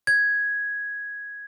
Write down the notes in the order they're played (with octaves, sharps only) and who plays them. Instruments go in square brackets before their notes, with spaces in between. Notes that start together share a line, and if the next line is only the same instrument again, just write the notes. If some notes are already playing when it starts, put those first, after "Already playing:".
[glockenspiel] G#6